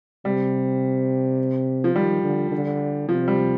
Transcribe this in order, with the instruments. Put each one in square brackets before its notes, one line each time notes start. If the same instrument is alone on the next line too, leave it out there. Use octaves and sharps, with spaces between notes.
[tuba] C3 [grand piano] G3
[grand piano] F3
[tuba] D#3 [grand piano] G3
[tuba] D3
D3
[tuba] C3 [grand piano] F3
[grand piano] G3